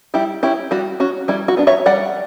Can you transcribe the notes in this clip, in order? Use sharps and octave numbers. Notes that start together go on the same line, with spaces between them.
G3 E4 G4
C#4 E4 G4
G3 F#4
C#4 F#4
G3 E4
F#4
B3 D4
C#5 E5
G3 D5 F#5